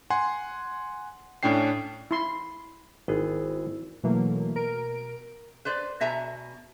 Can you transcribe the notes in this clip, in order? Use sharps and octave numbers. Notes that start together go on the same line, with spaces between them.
F#5 G#5 C6
A2 C#4 D4 G5 C7
E4 C6
G#1 B3 E4 G#4
B2 E3 F#3 A3 A#3
B2 A#4 D7
B4 C5 D5
B2 E5 G#5 A#5